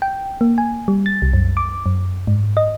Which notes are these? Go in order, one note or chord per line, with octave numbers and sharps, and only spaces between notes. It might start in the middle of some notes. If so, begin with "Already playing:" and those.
G5
A#3
G#5
G3
A6
C2
F#2
D6
F#2
G#2
D#5